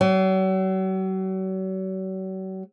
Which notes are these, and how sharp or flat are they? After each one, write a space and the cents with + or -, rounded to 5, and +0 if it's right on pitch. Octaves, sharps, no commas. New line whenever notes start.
F#3 +40